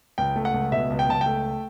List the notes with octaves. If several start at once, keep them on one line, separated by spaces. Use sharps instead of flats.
C#2 G5
A3
F#5
C#2
B2 E5
C#2
G5
C#2 A5
A3 G5